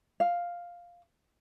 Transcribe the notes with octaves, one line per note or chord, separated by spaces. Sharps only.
F5